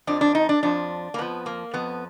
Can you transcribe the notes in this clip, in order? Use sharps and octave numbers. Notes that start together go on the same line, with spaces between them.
F2 F3 D4
D4
D#4
D4
F2 F3 D4
A#3
F2 F3 B3
A#3
F2 F3 B3